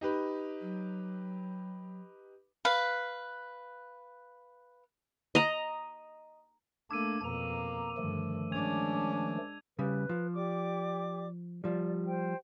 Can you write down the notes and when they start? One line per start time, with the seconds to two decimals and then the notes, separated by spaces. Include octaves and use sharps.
0.01 D#4 G4 B4
0.61 F#3
2.65 B4 F5
5.35 D#5 A#5
6.91 A3 A#3 D4 D6 E6 G#6 D#7
7.24 F2 B2 A#3 A#5
7.97 G2 D3 D#3 F3 A3
8.52 G#3 C#4 D4 G#6 F7
9.79 C#3 G3 B4
10.09 F3
10.35 G4 D5 D6
11.64 F3 G3 D5
12.06 C5 G5